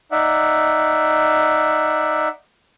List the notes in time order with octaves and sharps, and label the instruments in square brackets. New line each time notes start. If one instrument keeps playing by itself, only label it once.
[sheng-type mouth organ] D#4 D5 E5 F#5